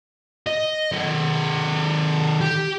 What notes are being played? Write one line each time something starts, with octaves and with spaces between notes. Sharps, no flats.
D#5
D#3 A4
G4